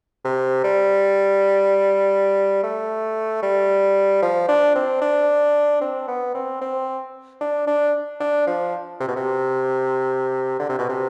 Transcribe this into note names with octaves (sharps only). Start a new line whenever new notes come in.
C3
G3
A3
G3
F3
D4
C4
D4
C4
B3
C4
C4
D4
D4
D4
F3
C3
B2
C3
D3
C3
B2
C3